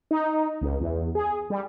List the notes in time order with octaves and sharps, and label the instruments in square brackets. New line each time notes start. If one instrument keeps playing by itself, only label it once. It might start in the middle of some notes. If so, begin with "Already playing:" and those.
[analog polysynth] D#4
C#2
E2
G#4
G3